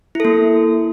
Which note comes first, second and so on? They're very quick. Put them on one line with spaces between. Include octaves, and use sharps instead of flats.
E4 A4 A#3